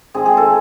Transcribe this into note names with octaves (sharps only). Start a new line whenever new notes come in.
D#3 G#3 C4 G#4
G#4
A4